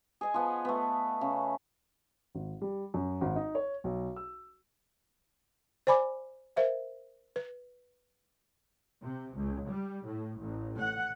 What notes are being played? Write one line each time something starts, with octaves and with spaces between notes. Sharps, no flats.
G#4 D#5 G#5
F3 B3 F#5
A3 B3
C#3
G#1
G3
F#2
G#1
D#4
C#5
B1
E6
C5 D5 G#5 B5 D6
A#4 C5 E5 F5
B4
C3
C#2
G3
A2
A1
F#5